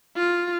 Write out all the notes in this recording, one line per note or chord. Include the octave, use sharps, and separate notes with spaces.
F4